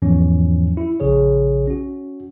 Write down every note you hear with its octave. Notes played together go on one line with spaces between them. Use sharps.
E2 G#2 E3 F3 C#4
E4
A#1 C#3 G#4 C#5
C#4 F#4